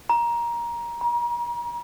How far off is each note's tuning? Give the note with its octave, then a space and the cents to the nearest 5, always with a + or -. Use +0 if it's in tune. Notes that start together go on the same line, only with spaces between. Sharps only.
A#5 +20
A#5 +40